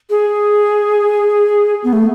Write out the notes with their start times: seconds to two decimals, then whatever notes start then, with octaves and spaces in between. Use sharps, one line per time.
0.10 G#4
1.84 B3
1.93 A3